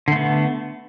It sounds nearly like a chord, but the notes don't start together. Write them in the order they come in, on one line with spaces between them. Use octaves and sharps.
D3 A3 B3